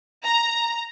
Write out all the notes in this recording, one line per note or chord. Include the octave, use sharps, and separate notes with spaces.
A#5